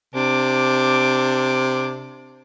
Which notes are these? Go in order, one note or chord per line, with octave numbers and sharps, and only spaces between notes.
C3 D4 D6